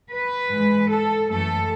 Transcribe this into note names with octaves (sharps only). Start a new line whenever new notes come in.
B4
G#2 E3 G#3
A4
F#2 E3 A3 A4